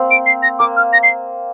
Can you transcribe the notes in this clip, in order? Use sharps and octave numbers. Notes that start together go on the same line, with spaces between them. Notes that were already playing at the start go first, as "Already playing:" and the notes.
Already playing: A#3 C4
D7
C7
A#6
A#3 D6
F6
A#6
C7